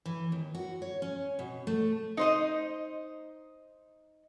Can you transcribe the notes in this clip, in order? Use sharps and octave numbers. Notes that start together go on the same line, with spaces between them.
E3
D#2
F#4
C#5
C#4
B2
A3
D#4 C5 D#5